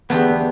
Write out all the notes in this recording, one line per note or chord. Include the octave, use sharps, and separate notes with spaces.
E2 D3 A3 B3 D4 G4